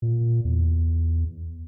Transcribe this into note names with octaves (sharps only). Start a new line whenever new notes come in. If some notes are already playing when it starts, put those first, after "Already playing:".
A#2
E2